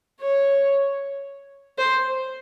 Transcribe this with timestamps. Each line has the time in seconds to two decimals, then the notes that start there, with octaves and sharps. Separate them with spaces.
0.21 C#5
1.78 C5